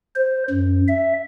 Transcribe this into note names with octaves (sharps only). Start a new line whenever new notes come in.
C5
F#2
E5